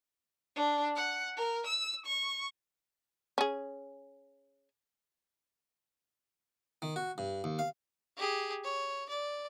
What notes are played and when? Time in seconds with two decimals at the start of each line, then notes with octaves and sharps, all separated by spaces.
0.56 D4
0.96 F#5
1.36 A#4
1.66 E6
2.05 C#6
3.38 C#4 G#4
6.82 D#3
6.96 F#4
7.18 G2
7.44 D#2
7.59 F5
8.17 G4 G#4
8.64 C#5
9.09 D5